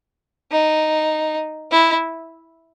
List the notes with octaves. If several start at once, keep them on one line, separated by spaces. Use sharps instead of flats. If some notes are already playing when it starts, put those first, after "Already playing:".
D#4
E4